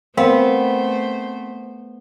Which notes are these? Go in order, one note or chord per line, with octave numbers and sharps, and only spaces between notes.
A3 B3 C4 A#4 C5 F5